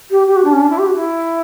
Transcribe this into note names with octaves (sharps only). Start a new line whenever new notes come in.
G4
G4
F#4
D4
C#4
D4
E4
G4
F#4
E4